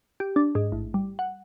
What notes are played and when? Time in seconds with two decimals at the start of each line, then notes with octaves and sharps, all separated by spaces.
0.20 G4
0.36 D4
0.55 G#2
0.72 A1
0.94 G3
1.19 F#5